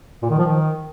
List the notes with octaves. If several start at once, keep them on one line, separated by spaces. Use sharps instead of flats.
A#2
D#3
F3
D#3